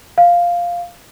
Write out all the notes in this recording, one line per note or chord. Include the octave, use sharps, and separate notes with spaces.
F5